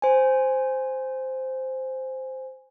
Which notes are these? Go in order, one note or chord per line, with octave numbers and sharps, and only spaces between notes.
C5 G#5